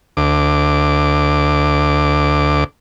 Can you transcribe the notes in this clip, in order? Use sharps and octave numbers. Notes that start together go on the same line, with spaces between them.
D2 D6